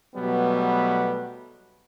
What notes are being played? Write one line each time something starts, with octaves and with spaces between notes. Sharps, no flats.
B2 F#3 G3 A3 B3